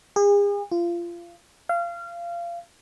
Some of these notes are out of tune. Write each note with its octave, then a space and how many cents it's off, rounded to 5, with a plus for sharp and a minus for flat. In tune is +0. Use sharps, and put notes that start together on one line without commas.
G#4 -40
F4 -25
F5 -25